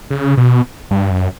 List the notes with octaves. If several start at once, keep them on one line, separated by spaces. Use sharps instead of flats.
C#3
B2
G2
F#2